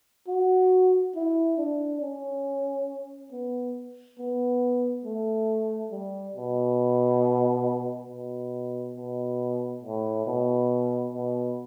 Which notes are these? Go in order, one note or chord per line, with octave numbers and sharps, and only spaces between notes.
F#4
E4
D4
C#4
B3
B3
A3
G3
B2
B2
B2
A2
B2
B2